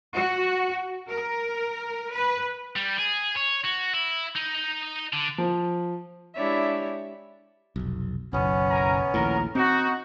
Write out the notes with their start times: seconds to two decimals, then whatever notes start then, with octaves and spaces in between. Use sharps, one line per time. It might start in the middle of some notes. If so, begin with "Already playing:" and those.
0.16 F#4
1.08 A#4
2.12 B4
2.76 G3
2.98 G#4
3.36 C#5
3.64 F#4
3.94 E4
4.36 D#4
5.13 D3
5.38 F3
6.36 G#3 D4 E4 G4 C#5 E5
7.76 F1 B1
8.33 F#1 B1 B3 C#4
8.70 A#4 G#5 A#5
9.14 A#1 D#2 A2 A#4
9.55 C4 D#4 F#4